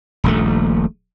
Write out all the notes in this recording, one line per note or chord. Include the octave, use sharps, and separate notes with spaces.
D#1 A#1 A3